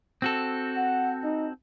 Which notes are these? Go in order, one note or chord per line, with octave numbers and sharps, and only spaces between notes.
C4 F#4 A4
F#5
D#4